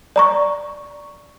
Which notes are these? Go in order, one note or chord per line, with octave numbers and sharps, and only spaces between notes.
D5 A#5 C#6